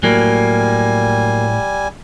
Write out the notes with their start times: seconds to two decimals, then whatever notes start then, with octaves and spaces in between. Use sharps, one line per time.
0.03 A2 F#3 G3 A#3 G#5